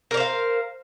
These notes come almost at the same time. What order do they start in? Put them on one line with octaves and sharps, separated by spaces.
A#4 D5 C5 F5